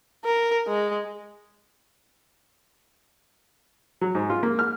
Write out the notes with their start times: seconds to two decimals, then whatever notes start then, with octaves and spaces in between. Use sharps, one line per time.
0.25 A#4
0.68 G#3
4.01 F#3
4.15 G#2
4.30 F4
4.43 A#3
4.59 F6